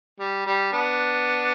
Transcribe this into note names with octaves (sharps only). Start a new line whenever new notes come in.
G3
G3
B3 D4